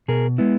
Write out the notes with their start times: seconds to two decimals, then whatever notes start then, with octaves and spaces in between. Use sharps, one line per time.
0.08 B2 G#4 A#4
0.38 G#3 B3 E4